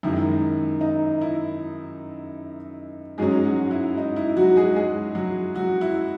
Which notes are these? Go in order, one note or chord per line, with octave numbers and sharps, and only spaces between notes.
F#2 D#3 G#3 E4
D#4
E4
G#2 F#3 G#3 C#4 G#4
F#3 F#4
E4
D#4
E4
F#3 F#4
G#3 G#4
G#3 G#4
F#3 F#4
F#3 F#4
E4